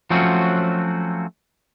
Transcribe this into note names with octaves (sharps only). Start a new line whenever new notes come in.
F3 F#3 A3 C4 C#4 F#4